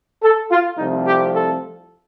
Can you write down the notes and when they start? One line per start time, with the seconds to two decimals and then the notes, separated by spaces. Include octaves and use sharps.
0.22 A4
0.51 F4
0.78 C2 C3 F3 A3 D#4
1.06 G4
1.34 A4